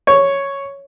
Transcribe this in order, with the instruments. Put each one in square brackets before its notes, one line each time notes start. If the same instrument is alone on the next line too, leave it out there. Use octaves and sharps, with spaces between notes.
[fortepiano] C#5